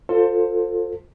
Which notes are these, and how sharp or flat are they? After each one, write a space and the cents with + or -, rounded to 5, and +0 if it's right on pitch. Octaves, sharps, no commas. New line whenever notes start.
F4 +25 A4 +25 C5 +5